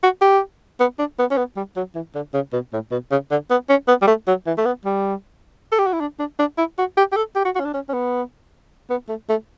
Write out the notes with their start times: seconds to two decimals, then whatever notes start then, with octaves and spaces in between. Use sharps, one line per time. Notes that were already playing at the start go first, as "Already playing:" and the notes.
0.03 F#4
0.21 G4
0.80 B3
0.98 D4
1.19 B3
1.31 C#4
1.37 B3
1.57 G3
1.76 F#3
1.95 E3
2.15 D3
2.34 C#3
2.53 B2
2.73 A2
2.91 B2
3.11 C#3
3.31 D3
3.50 B3
3.69 C#4
3.88 B3
4.02 G3
4.07 A3
4.28 F#3
4.47 E3
4.58 A3
4.66 B3
4.85 G3
5.72 A4
5.79 G4
5.86 F#4
5.93 E4
6.01 D4
6.19 D4
6.39 D4
6.58 E4
6.78 F#4
6.97 G4
7.12 G4
7.16 A4
7.36 G4
7.45 F#4
7.56 F#4
7.60 C#4
7.65 D4
7.74 C#4
7.89 C#4
7.93 B3
8.90 B3
9.09 A3
9.29 A3